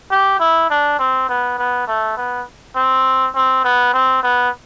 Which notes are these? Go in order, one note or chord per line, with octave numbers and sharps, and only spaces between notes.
G4
E4
D4
C4
B3
B3
A3
B3
C4
C4
B3
C4
B3